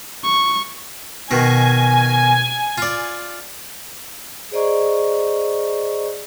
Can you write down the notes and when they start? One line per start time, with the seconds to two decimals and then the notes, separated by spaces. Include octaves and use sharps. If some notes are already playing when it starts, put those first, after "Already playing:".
0.24 C#6
1.31 B2 D#3 G#5
2.78 F4 D5
4.51 G#4 C5 D5 D#5 A#5 C#6